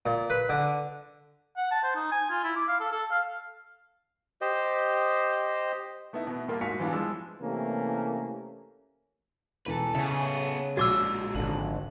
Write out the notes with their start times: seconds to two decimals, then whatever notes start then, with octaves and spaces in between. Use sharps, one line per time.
0.06 A#2
0.30 B4
0.49 D3
1.57 F#5
1.71 A5
1.83 C5
1.96 D#4
2.12 G#5
2.30 F4
2.44 E4
2.56 D6
2.68 F5
2.80 A4
2.92 A4
3.11 F5
4.41 G4 C5 D#5
6.13 A3 B3 D#4 E4
6.27 B2 B3
6.48 A#2 G3 A3 A#3 F4 A#4
6.61 G#2 F#4 F5 G#5 B6 C#7
6.80 E3 F#3 G3 B3 D4 F4
6.93 F3 G#3 E6
7.40 C3 E3 A3 A#3 C#4 G4
9.66 E1 E3 A4 B4 A#5
9.95 C#3 B3 A4 E5 G#5
10.77 A#1 F3 G#3 F#4 D6 E6 G#6 A6
11.35 G#1 D3 A4 F#7